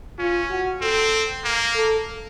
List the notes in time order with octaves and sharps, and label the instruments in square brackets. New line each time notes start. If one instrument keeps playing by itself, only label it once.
[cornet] C#4 [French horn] F4
[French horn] F#4
[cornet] C4 [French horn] A4
[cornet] A#3
[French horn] A4